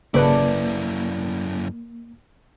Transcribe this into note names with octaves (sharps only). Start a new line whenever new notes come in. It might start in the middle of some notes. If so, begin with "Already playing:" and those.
G#1 F#2 C#3 A#3 E4 A4 B4 D5